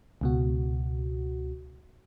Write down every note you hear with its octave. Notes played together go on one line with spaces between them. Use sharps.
C#2 B2 F#4